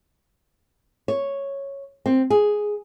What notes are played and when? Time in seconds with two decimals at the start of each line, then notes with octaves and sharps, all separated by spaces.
1.08 C#5
2.06 C4
2.30 G#4